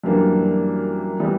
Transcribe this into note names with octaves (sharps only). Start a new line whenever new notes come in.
F#2 E3 G3 A#3 D4
E3 G3 B3